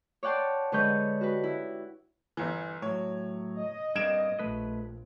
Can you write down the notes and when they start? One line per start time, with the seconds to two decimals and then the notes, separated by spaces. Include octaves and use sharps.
0.23 C#5 D5 F#5 G5 A5 C6
0.72 D3 G#3 B4 C#5 D#5 G6
1.21 F#4 G4 B4
1.43 E4
2.37 G1 E3
2.82 A2 F#3 C#5
3.56 D#5
3.95 G2 A#3 C4 G#6 D7 E7
4.39 A#1 A3 B4 D#5